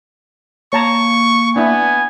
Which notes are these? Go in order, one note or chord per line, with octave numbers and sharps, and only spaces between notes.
A#3 C#5 A5 A#5 C#6
B3 D4 E4 G#5